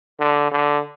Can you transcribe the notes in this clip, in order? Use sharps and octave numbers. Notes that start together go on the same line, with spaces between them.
D3
D3